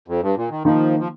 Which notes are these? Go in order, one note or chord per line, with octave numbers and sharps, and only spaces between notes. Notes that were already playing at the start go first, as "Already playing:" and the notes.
F2
G2
A#2
D#3
D#3 F3 A#3 D#4
F3